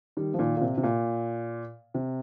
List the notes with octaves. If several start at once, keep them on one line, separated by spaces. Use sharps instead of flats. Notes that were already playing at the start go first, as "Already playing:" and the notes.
D#3 G3
F3
A#2 D#3
A#2
C3
C3
A#2
C3